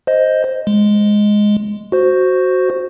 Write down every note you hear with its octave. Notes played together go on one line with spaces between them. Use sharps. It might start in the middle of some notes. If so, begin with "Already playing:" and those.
C5 D#5
G#3
F#4 C5